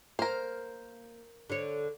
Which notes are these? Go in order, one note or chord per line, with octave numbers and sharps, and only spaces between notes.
A#3 A#4 C5
D3 C#5